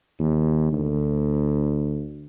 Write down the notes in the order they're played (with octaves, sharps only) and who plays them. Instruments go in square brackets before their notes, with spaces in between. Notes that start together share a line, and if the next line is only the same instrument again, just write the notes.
[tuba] D#2
D2